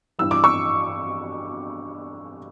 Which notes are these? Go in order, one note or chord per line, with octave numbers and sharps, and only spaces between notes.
G2 E3 G3 E6
D6
C#6 E6